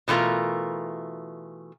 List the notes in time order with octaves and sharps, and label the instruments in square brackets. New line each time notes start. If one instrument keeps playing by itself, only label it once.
[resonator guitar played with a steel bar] B2 E3 A3 F4 A#4